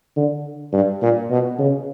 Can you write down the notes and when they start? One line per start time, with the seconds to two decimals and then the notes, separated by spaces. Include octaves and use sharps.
0.16 D3
0.73 G2
1.02 A#2
1.30 B2
1.59 C#3